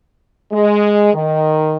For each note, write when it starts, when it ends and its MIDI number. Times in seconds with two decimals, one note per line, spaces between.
0.52 1.14 56
1.14 1.77 51